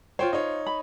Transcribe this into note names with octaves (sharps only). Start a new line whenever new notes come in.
F4 C5 C#5 G5
D#4 C#5
B5